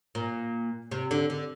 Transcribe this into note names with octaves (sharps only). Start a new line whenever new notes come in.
A#2
C3
D3
D3